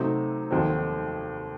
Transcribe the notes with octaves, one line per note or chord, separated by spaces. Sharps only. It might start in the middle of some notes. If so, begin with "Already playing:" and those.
Already playing: C3 F#3 A3 C4 D#4
F1 D#2 D#3 F#3 C4